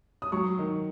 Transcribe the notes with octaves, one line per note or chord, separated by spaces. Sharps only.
D#6
F#3 C#6
D#3